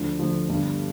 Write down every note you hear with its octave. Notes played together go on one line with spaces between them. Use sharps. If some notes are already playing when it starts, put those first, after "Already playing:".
Already playing: D2 D3 F3
D2 D3 F3
G1 G2 D3